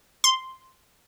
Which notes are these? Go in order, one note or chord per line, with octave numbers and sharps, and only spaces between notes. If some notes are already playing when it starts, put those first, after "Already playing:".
C6